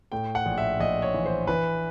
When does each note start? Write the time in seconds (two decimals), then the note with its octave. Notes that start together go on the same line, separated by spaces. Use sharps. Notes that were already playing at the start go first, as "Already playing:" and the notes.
0.12 A2 G5
0.35 F#5
0.46 A#1
0.58 E5
0.80 A#1 D#5
1.02 C#5
1.14 E3
1.26 C5
1.47 E3 B4